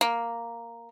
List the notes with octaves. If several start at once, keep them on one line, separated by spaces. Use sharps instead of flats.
A#3